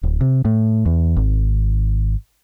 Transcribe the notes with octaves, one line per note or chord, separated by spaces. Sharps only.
D1
C3
A2
E2
G#1